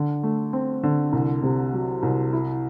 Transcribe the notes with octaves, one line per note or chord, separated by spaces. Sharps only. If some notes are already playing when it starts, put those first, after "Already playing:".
Already playing: D3
A3
C4
D3
C2
C3
F#3
C2
E4